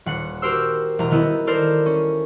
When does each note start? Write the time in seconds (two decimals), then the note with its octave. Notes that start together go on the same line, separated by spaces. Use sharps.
0.06 D#1 F#5 C#7
0.42 F#4 G4 A#4 C5 E6
0.99 E1 A#5
1.11 D#3 B3 E4 D#5
1.47 A4 A#4 C5 D5
1.86 C#4